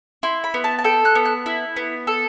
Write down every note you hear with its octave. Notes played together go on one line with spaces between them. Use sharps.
E4 C6
B5
B3
A5
A5
A4 G5
F#6
B3
F#6
E4
B3
A4